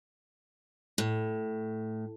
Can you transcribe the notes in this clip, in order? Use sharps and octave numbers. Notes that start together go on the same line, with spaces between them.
A2